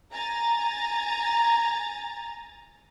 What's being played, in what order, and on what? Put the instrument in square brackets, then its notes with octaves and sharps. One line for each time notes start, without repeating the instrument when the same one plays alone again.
[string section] G#5 A#5 A6